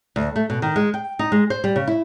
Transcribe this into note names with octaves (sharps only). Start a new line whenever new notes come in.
D2
A3
B2
D#3
G#3
G5
D#4
G#3
C5
G3
C#3
E4